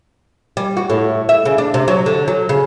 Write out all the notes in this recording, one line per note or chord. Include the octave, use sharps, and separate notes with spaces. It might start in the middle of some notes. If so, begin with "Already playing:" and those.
G3
F#4
A2
E5
C#3
D4
C3
F#3
D3
F#3
C#3